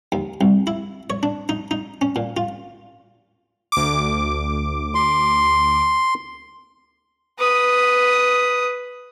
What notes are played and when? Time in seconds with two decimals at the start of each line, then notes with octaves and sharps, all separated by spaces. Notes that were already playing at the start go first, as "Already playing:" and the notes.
0.12 D#2
0.41 C2
0.67 E4
1.10 C#5
1.23 D4
1.49 D#4
1.71 D#4
2.01 C#4
2.16 A#2
2.37 F4
3.72 D2 D6
4.95 C6
7.39 B4 D#6